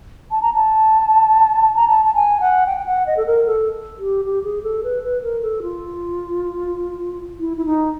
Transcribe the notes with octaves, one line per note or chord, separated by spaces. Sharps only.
A5
A#5
A5
A#5
A5
A5
G#5
F#5
G5
G5
F#5
D#5
A4
A#4
A4
G4
G4
G#4
A4
B4
B4
A#4
A4
F4
E4
E4
D#4